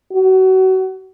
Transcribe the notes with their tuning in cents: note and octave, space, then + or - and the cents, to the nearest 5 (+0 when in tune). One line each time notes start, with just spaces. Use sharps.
F#4 +30